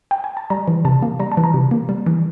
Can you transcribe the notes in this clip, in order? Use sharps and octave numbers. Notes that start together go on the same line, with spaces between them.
G5
G#5
A5
G3 A#5
E3
C3 A5
A#3
G3 A#5
A5
E3
A#5
C3
A#3
G3
E3